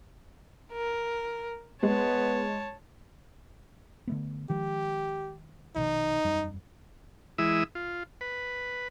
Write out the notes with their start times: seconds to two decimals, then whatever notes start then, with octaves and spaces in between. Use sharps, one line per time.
0.72 A#4
1.83 G#3 B3 C#5 A5
4.08 D3 A3 B3
4.50 D#3 F3 G#3 G4
5.76 A#1 B2 D#3 D#4
6.24 E1 F#2 G3
7.38 E3 G#3 E4 D#6 E6
7.75 F4
8.21 B4